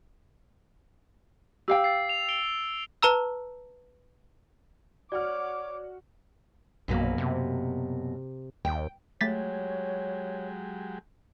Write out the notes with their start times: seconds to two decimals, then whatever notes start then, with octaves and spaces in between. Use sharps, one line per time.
1.68 G4 F5 G5 E6
1.84 A6 C7
2.09 F7
2.29 D7 G7
3.02 B4 A5 A#5 E6
5.12 F#4 C#5 D5 F#5 D6 F6
6.88 A#1 F#2 B2 A#3
7.18 C3
8.65 D#2 G5
9.21 F#3 G#3 A3 G4 C#5 A6 B6